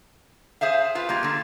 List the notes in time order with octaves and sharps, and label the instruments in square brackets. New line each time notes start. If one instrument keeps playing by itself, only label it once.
[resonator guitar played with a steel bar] G#4 C5 E5 F5
F4 B4 F5
G3 A#3 F4
D3 A#3